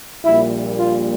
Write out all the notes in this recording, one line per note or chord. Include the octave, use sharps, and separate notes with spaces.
A#1 A#2 G3 A#3 E4
F4